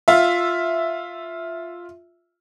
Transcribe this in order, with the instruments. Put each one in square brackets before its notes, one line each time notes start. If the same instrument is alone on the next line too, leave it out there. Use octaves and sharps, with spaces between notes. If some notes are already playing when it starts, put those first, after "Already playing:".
[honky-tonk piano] F4 E5